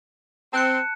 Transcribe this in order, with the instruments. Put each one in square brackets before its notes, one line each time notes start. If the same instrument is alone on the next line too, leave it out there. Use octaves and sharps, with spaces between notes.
[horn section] C4 [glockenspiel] A5 F#6 C#7